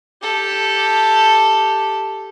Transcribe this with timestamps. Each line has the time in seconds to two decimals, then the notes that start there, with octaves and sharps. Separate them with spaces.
0.22 G4 A4